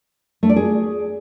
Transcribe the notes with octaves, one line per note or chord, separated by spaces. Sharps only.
A3
D5
G#4